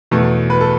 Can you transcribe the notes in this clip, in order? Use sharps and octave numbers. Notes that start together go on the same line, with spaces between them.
E2 B2 A3
B4
A4